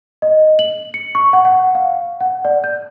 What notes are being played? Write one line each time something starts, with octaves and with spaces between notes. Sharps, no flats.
D#5
F#7
C#7
C#6
F#5
F#5
F5
F#5
D5
G6